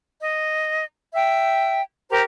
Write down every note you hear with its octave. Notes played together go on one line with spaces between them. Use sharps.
D#5
E5 G5
G4 A#4 C5 A#5